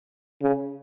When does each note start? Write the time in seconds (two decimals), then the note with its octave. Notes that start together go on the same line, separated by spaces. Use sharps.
0.42 C#3